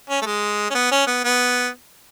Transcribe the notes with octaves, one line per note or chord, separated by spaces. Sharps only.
C#4
A3
G#3
C#4
B3
C#4
B3
B3